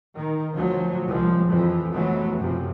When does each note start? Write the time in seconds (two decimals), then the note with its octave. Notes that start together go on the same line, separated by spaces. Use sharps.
0.17 D#3
0.53 D2 F3 F#3
1.08 C2 F3 G#3
1.50 F2 E3 F3
1.92 F1 E3 F#3 G#3 A3 B3
2.38 F#2 C3 F3